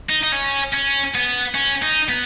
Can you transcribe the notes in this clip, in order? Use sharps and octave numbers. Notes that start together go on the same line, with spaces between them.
D#4
D#4
C#4
C#4
B3
C#4
D#4
B3